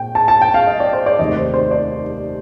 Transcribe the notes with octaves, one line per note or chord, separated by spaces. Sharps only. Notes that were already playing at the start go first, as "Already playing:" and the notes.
Already playing: A#2 G5
A5
A5
G5
F5
D#5
D5
C5
D5
F1 D#2 D#3 D#5
C5
C5
D5